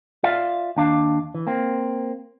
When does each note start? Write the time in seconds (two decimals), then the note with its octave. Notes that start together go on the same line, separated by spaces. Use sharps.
0.23 F4 D5 E5 F5
0.77 D#2 D4 F5
1.35 E3
1.47 A#3 C4